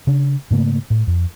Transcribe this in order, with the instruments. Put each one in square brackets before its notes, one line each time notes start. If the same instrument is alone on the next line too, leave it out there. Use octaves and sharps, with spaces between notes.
[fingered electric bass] C#3 D4
G#2 C#3 A3 A#3
A2
F2